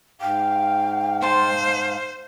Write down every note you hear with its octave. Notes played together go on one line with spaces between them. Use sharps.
G#2 F5 G5
D#4 C5 A5 C6